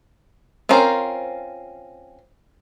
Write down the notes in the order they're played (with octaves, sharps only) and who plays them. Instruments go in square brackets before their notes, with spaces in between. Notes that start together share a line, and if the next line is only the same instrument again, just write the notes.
[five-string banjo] C4 C#4 F4 A#4 C5